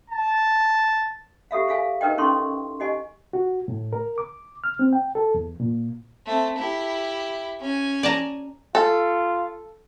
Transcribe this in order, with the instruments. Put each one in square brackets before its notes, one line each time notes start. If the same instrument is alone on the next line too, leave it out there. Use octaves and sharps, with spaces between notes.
[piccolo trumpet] A5
[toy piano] G4 A4 E5 F5
G#4 E5 F5 G#5
D#4 A#4 B4 D#5 G5
C#4 D#4 E4 A4 C6 C#6
G4 D#5 G#5
[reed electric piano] F#4
A2
A#4
D6
F6
C4
G5
A4
E2
A#2
[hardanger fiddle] A3 C4
E4 G4
C#4 G#5
[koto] D5 A5 A#5
[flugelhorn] F4 [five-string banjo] A4